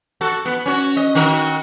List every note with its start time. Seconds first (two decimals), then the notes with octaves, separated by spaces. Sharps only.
0.21 F#4 A4
0.46 B3
0.66 C#4 F#4
0.97 D#5
1.15 D#3 F#4 A#4